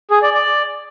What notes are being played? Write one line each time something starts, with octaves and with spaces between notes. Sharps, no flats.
G#4
D5
D5